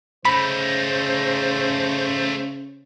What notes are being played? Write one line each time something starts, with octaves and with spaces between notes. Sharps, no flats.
C#3 A3 D#4 C5 B5